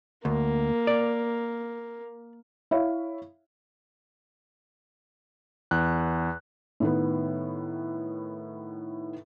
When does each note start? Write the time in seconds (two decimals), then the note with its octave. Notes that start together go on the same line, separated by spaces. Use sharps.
0.25 D2 A#3
0.87 D5
2.71 E4 C#5 E5 F5
5.71 E2 F#6
6.80 A2 D#3 B3